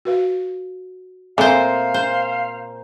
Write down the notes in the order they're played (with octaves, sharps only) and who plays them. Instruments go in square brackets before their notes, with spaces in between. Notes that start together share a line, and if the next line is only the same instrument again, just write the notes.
[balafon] F#4 B4 F5
[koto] A#2 C5 [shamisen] A3 [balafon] C4 [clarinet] F5
[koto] C5